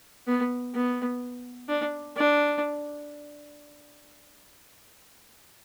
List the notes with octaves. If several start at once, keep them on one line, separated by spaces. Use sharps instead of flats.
B3
B3
D4
D4